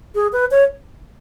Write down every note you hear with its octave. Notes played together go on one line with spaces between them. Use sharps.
G#4
B4
C#5